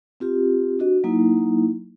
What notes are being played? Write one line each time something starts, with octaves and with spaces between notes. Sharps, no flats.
C4 F4 G4
D4 F#4 D#5
F#3 A#3 D#4 E4